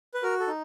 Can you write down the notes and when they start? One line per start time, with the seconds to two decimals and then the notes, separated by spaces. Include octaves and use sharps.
0.14 B4
0.23 F#4 A#4
0.40 A4
0.48 D#4